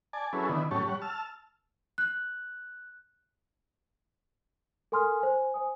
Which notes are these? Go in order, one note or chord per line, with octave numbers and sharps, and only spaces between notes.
D5 G#5 A5
F#3 C#4 E4 G#4 A4 B4
D3 D#3 B3 E4
A2 F#3 C#4 G4 C#5 A5
G3 C#5 F#5
A5 E6 F6
F#6
A4 A#4 G#5 C6 D#6 F6
C5 G#5
C5 G#5 D#6